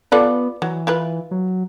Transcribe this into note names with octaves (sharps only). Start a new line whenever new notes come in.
B3 F4 A4 B4 D5
E3 F#3
E4 F4 B4
F#3